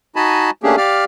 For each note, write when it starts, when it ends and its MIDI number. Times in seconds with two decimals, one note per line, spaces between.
0.16 0.50 63
0.16 0.50 66
0.16 0.50 75
0.16 0.50 80
0.16 0.50 81
0.16 0.50 83
0.63 0.76 57
0.63 0.76 58
0.63 0.76 61
0.63 0.76 62
0.63 0.76 67
0.63 0.76 68
0.77 1.05 67
0.77 1.05 74
0.77 1.05 77
0.77 1.05 89